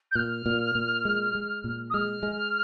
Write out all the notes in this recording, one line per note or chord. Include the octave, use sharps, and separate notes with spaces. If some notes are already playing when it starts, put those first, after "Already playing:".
G6
A#2 F6
A#2
A#2
G#3
G#3
A#2
D#6
G#3 F6
G#3